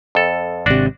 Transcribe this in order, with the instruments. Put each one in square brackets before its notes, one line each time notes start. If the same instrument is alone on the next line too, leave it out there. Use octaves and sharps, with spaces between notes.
[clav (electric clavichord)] F2 A4
[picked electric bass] G#1 C3 [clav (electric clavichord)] D4 F#4 D5